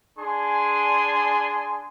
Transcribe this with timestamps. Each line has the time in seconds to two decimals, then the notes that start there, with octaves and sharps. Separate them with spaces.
0.19 D4 G#4 G#5 C6